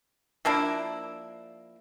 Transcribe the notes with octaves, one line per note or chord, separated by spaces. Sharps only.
F3 A#3 D4 E4